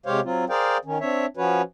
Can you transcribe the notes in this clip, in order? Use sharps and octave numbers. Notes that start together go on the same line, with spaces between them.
C3 G#3 G4 C5 C#5 F5
F#3 C4 F4
G#4 A#4 C5 D5 F5 G5
D#3 C#4
C4 D4 C#5 E5
F3 C#4 F#4 B4 C#5